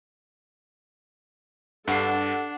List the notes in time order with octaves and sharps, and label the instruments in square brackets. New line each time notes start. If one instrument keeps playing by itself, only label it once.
[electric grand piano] G2 C7 [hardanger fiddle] D4 [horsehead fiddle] G4 A4 [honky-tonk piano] F#5